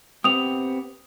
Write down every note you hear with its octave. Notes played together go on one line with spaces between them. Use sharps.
B3 C4 G4 D#6 F7